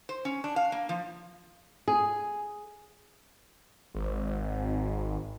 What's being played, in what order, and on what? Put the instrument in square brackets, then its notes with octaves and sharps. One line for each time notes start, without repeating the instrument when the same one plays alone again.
[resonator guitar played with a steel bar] C5
C#4
D4
F5
A#3
F3
[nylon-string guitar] G#4
[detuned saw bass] G#1